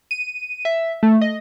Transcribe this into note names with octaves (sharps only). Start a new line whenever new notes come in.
D#7
E5
A3
D#5